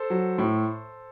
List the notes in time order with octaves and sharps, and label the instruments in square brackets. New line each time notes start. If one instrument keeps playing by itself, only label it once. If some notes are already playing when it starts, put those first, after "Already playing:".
Already playing: [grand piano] A4 C5
F#3
A2